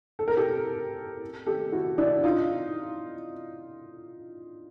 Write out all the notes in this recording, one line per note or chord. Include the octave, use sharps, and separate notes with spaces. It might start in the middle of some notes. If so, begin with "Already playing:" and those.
A4
A#4
G4 A4
G4 A4
E4 F#4
D4 E4
D#4 F4